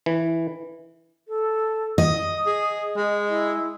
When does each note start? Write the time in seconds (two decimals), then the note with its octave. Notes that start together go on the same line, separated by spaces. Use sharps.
0.06 E3
1.27 A4
1.98 D#5 D#6
2.47 G#4
2.97 G#3
3.28 E4